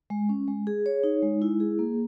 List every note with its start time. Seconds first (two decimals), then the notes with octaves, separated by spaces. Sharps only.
0.10 G#3
0.29 C#4
0.48 G#3
0.67 G#4
0.86 C#5
1.04 D#4
1.23 G#3
1.42 E4
1.60 G#4
1.79 A#3